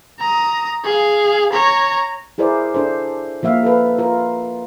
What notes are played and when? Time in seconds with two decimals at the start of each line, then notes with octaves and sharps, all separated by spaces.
0.19 A#5 D#6
0.84 G#4 F5
1.53 C#5 A#5
2.38 E4 G#4 A#4 C5 D5
2.74 D4 A4 C5
3.43 F3 A#3 E5 F5
3.63 A4 B4
3.98 F4 A#4